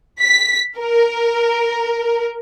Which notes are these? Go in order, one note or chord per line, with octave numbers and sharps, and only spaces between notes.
B6
A#4